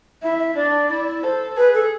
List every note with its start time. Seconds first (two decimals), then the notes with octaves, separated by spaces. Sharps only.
0.23 E4 E5
0.39 E5
0.56 D4 D5
0.90 E4
1.23 A4 C5
1.57 G#4 B4
1.74 A4